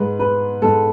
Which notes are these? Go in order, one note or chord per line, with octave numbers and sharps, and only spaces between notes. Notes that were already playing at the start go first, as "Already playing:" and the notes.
Already playing: G#2 G#3 B4
B4
G#2 G#3 A4